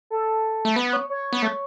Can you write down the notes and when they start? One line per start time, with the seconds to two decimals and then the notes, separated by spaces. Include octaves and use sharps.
0.10 A4
0.65 A3
0.76 B3 B4
0.93 C#5
1.10 C#5
1.33 B3
1.42 A3